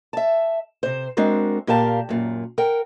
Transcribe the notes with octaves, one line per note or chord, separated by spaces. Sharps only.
E5 A5
C3 C5
G#3 C4 D4 F#4 A#4
A#2 G4 A#4 F5 A5
F#2 A#2
A#4 F#5 G5